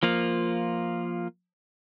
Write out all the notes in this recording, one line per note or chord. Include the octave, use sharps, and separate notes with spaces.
F3 A#3 F4